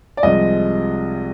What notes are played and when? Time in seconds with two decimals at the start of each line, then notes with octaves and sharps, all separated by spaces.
0.17 D5
0.23 C2 C3 F3 G#3 D#5